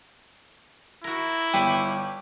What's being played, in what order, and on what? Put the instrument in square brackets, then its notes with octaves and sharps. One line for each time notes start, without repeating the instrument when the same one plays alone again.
[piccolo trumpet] E4 [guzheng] F#4 A#4
[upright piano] G1 G5 [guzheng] G3 B4